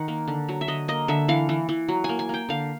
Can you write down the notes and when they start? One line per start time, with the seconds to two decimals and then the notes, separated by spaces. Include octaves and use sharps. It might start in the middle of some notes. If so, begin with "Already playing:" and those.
Already playing: D#3 F#5
0.08 A#3
0.28 D3
0.49 F#3
0.61 E5
0.68 D3 D#5
0.88 A#3 D#5
1.08 D3 E5
1.28 E3 F5
1.49 E3
1.69 E3
1.88 F#3
2.04 G#5
2.09 A#3
2.19 G#5
2.29 A#3 G5
2.49 D3 F5